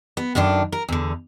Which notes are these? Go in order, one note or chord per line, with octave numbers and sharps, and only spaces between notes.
B3
F#2 D3 D#3 D4
A#4
E2 D3